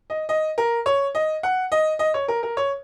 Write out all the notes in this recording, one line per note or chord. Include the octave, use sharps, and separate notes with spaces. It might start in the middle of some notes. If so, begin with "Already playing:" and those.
D#5
D#5
A#4
C#5
D#5
F#5
D#5
D#5
C#5
A#4
A#4
C#5